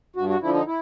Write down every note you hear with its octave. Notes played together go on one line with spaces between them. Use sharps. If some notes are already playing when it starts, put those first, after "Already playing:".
G2 F#4
F#4
D3 F3 E4
D#4
E4